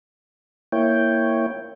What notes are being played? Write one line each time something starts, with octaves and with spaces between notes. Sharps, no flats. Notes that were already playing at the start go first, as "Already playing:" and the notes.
A#3 E4 C#5 G5